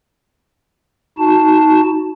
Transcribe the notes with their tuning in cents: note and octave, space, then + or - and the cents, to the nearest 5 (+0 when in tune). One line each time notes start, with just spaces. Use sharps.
D#4 +20 F#4 +0 A5 +0